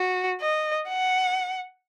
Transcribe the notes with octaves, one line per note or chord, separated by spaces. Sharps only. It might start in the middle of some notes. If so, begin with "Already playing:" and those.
Already playing: F#4
D#5
F#5